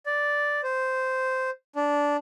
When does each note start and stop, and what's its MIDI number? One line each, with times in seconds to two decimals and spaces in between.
0.06 0.61 74
0.63 1.50 72
1.76 2.17 62